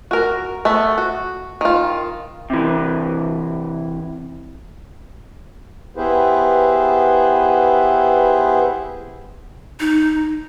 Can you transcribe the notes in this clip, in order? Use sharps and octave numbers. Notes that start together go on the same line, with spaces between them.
F#4 A#4
A3 B3 E5
F#4
D#3 F4
C3 E3
B3 E4 G4 G#4 B4 C5
D#4